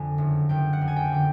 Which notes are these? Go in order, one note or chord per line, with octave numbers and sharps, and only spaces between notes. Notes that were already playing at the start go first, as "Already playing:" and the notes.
Already playing: F2 D3 G#5
F#1
F#1 G5
F#5
F2
G#5
G5
D3 G5